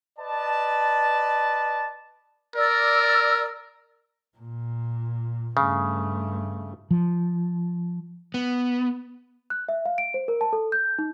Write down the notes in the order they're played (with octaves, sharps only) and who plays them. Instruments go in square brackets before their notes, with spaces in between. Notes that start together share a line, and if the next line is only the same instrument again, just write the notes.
[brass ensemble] B4 D5 D#5 A5
[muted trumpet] A#4 [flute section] D5 E6
[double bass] A#2
[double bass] G2 A3 [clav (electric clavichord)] C#3
[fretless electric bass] F3
[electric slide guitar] B3
[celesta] F#6
E5
F5
D7
C5
A#4
A5
A4
G6
D#4